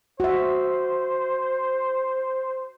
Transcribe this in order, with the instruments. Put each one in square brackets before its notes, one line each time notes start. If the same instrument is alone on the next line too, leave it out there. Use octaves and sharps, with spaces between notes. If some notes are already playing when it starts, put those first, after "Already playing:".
[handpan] F#4 E5 [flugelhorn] C5